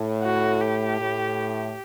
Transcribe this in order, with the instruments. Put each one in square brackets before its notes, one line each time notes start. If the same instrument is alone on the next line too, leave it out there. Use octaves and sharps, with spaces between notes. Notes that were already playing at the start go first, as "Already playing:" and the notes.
Already playing: [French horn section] A2
[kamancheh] F#4
G4
[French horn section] A2